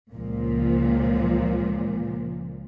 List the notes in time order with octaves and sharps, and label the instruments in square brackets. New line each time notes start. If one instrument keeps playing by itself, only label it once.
[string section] C#2 A#2 F3